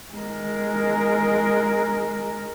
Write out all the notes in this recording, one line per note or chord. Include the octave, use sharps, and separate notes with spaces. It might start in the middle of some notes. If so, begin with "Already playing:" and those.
G#3 A#4